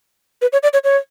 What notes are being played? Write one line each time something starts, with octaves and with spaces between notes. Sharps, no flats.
B4
C#5
D5
C#5
C#5